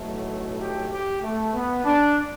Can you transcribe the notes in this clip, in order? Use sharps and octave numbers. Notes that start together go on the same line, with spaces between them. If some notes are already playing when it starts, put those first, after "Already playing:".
Already playing: B1 A2 F#3 A3
G4
G4
A3
B3
D4